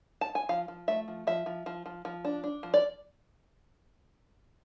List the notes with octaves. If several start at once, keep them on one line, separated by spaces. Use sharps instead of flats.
A5
G#5
F3 F5
F3
A3 E5
F3
F3 E5
F3
F3
F3
F3
D4
D4
F3
D5